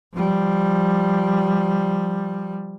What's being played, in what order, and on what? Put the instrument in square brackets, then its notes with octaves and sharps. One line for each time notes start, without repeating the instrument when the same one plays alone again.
[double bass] F3 G3